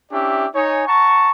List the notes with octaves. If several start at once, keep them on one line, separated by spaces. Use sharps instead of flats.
C#4 D4 E4 G4 D5 E5
D#4 C#5 G#5
F#5 A5 A#5 C#6